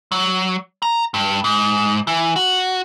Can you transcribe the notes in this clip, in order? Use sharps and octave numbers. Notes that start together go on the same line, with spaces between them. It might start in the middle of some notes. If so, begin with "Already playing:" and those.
F#3
A#5
G2
G#2
E3
F#4